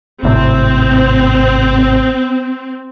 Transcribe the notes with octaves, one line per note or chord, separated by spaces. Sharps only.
G#1 A2 C3 C4